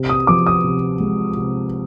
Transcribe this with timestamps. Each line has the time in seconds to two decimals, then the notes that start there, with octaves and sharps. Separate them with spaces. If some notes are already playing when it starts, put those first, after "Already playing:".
Already playing: C3
0.09 D#6
0.27 F3 D6
0.46 D#6
0.64 C3
1.00 G#3
1.37 C3